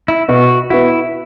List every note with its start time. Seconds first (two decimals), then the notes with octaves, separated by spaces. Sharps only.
0.08 E4
0.29 B2 F#4
0.70 B3 E4 F#4